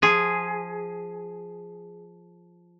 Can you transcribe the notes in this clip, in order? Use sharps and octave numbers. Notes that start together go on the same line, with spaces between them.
F3 G#4